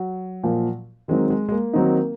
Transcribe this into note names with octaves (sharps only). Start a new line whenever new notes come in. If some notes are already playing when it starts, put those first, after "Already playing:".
Already playing: F#3
A#2 F3 A#3
D#3 F#3 G#3 C4 D#4
G#3
G#3
A#3
D#3 F#3 C4 D#4